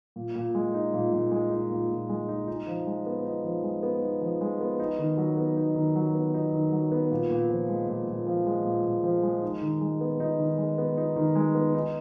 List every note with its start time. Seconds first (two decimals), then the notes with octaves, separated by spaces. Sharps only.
0.16 A#2
0.35 A#2
0.55 G#3
0.74 D#4
0.94 A#2
1.13 A#2
1.31 G#3
1.51 D#4
1.70 A#2
1.89 A#2
2.09 G#3
2.29 D#4
2.48 D#4
2.67 F3
2.87 G#3
3.06 B3
3.25 D#4
3.44 F3
3.63 G#3
3.83 B3
4.02 D#4
4.21 F3
4.41 G#3
4.61 B3
4.80 D#4
4.99 D#3
5.17 F#3
5.37 B3
5.57 D#4
5.75 D#3
5.95 F#3
6.15 B3
6.34 D#4
6.53 D#3
6.72 F#3
6.92 B3
7.10 A#2
7.30 A#2
7.50 F3
7.69 G#3
7.88 A#2
8.07 A#2
8.26 F3
8.46 G#3
8.65 A#2
8.85 A#2
9.04 F3
9.23 G#3
9.43 D#4
9.62 D#3
9.81 G#3
10.01 B3
10.20 D#4
10.39 D#3
10.58 G#3
10.78 B3
10.97 D#4
11.16 D#3
11.35 G#3
11.55 B3
11.74 D#4